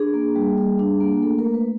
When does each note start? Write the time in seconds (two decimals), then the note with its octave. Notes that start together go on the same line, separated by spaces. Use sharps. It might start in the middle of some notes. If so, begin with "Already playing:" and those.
Already playing: D4 G#4
0.14 A#3
0.36 G3
0.58 G3
0.79 D4
1.00 A#3
1.22 A3 A4
1.39 A#4
1.44 A3
1.54 B4